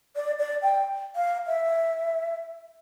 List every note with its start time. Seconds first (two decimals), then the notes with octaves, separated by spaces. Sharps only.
0.16 D5
0.39 D5
0.62 G5
1.16 F5
1.47 E5